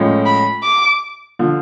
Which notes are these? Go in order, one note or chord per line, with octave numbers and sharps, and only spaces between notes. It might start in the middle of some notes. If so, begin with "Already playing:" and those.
Already playing: A2 F3 G#3 C#4
B5
D6
D3 F3